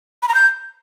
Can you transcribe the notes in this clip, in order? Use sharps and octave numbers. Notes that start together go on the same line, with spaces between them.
B5
A#5
G6